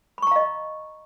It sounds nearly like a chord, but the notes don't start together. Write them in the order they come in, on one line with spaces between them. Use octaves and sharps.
B5 C#6 A#5 F5 D#5